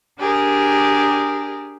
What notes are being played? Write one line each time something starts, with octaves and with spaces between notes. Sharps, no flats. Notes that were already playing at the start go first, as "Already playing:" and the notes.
D4 G4 G#4 A#4